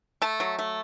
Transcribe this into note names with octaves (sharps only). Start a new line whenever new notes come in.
A3 A5
F#3
A3